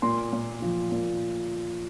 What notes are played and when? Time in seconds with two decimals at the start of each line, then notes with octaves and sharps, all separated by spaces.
0.02 A#2 C6
0.33 A#2
0.62 F3
0.92 A#2